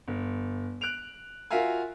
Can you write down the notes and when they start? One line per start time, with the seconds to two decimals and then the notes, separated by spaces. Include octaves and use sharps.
0.08 G1
0.81 F#6 D7 F7
1.51 F4 F#4 A#4 E5 F5 G#5